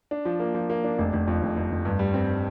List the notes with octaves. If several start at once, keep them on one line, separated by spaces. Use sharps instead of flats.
D4
F3
A#3
F3
A#3
D4
F1
F1
F2
F1
F1
F1
G2
G3
C4